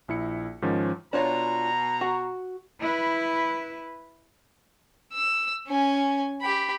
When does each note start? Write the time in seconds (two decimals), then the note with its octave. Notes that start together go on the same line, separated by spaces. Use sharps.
0.08 A#1 E4 C#7
0.62 G#2 D#3 F3 C#4
1.13 B2 D4 F4 C#5 A#5
2.01 F#4
2.80 E4 B4
5.13 E6
5.68 C#4 G#5
6.41 G4 B5